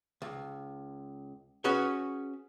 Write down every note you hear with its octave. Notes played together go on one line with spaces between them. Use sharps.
C#2
C#4 F#4 G#4 B4 C#5